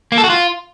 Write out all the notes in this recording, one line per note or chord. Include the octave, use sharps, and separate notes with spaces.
A#3
A4
F#4
F4